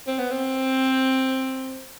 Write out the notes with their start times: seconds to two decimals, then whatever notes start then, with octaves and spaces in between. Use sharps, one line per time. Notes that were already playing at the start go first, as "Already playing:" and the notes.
0.07 C4
0.19 B3
0.31 C4